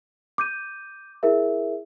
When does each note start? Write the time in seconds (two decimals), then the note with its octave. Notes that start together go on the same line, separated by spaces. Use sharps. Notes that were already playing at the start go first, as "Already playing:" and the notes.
0.38 D6 G6 D#7
1.23 E4 G#4 A#4 E5